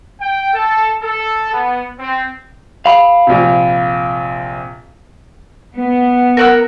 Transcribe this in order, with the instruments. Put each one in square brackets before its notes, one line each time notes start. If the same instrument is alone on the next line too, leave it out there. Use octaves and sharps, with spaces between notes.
[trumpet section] G5
A4
A4
B3
C4
[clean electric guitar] F5 B5
[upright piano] A#1 C3
[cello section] B3
[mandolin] A#4 F#5 E6